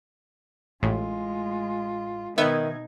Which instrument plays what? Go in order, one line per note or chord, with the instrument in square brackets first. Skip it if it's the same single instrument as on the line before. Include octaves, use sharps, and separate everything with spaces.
[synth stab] A1 A2 [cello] G#3 F4
[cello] B2 D#4 [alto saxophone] D#3 [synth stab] B3 E5 G#6